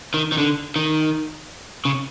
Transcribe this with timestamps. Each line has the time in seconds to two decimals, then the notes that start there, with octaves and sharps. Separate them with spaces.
0.14 D#3
0.32 D#3
0.38 D3
0.76 D#3
1.85 C#3